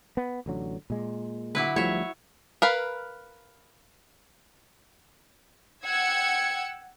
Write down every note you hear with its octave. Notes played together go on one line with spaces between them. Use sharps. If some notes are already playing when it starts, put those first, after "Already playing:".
B3
A1 D3 F#3
A#2 G#3
D3 F#3 E4 B4 D6
D2 F3 G3 A3 E4 C#5 E5
A#4 B4 F5
F#5 G5 E6 G#6 C#7